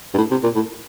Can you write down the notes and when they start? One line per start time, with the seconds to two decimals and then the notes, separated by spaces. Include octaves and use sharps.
0.14 G2
0.18 A2
0.31 C3
0.44 A#2
0.55 A2